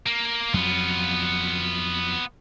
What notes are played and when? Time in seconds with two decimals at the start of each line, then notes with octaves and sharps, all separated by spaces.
0.06 A#3
0.54 F2 F#3 B3 F4